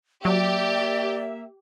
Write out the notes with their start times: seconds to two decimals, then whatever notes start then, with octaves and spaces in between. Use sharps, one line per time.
0.25 F#3 A#3 G4 D5 E5